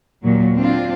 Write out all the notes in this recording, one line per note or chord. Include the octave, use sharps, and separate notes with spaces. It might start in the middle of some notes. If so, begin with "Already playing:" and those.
D#2 A#2 F#3
C4 D4 F4